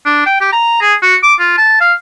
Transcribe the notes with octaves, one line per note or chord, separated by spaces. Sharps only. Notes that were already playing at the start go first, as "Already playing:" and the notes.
D4
G5
G4
A#5
G#4
F#4
D6
F4
A5
F5